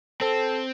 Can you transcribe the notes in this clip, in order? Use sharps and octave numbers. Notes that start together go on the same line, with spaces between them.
C4 A4